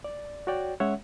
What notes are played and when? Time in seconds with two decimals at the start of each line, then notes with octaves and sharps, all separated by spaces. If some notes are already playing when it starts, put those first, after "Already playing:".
0.04 D5
0.47 F#4 C#5 D5 G5
0.80 G#3 C#4 C#5 E5 F#5